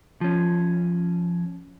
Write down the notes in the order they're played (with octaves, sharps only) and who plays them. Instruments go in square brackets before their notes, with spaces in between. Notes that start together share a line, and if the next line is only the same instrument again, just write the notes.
[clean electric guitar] F3 C#4